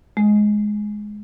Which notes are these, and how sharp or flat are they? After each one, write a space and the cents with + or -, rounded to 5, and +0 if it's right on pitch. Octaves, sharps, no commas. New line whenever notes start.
G#3 +10